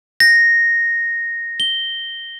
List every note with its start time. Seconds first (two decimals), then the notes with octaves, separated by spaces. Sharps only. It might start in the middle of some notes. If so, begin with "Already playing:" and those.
0.20 A#6
1.60 G7